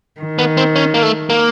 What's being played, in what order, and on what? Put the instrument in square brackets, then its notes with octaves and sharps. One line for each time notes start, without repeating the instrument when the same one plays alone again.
[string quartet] D#3
[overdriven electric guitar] B3
C4
C#4
A#3
A3
A#3